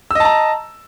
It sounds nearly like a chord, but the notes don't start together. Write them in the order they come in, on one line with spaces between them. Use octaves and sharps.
E6 D#5 A5 A#5